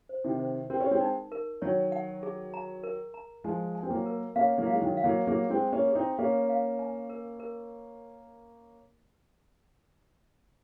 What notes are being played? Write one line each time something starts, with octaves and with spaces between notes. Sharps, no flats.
C5
C3 D#3
C5
C4 A#4
C#4
G#3 C4
D#4
A#4
D#3 F#3 C#5
F#5
G#4
A#5
A#4
A#5
F3 G#3 G#5
G#5
C4
F#3 A#3
A#4
A#3 C#4 F5
F#3 A#3
F5
G#3
D#3 F#3
F5
F#3 A#3
F#3 A#3 G#4
G#3 C4
G#4
A#3 C#4
G#4
C4 D#4
A#3 C#4 F5
F5
G#5
A#4
A#4